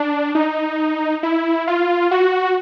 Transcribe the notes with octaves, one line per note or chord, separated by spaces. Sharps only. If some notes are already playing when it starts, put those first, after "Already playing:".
Already playing: D4
D#4
E4
F4
F#4